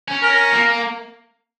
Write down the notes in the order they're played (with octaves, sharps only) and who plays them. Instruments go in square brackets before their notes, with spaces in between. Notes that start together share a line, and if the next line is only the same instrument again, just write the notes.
[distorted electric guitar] C#4
[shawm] A#4
[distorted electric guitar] A#3